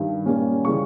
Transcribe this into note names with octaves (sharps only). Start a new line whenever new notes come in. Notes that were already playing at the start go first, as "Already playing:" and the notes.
Already playing: G2 D#3
A#2 G3 A#3 C#4
C#3 E3 G3 C#6